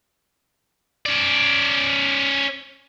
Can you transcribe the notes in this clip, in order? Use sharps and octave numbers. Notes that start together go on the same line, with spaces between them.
C#4 D5